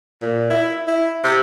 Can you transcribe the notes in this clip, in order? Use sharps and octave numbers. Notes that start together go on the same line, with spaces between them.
A#2
E4
E4
C3